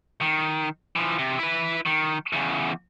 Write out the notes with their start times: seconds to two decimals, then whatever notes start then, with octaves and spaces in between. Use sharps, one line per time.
0.21 D#3
0.96 E3 F3
1.19 C3
1.39 E4 B4
1.86 D#3
2.33 E2 C#3